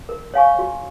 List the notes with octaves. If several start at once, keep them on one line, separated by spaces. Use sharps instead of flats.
A#4
C#5 F5 G#5 C#6
F#4